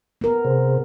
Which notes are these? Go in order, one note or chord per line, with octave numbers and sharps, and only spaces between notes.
B3 A#4
C3 G#4 C5